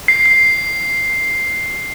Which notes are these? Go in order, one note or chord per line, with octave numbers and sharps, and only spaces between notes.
C7
C7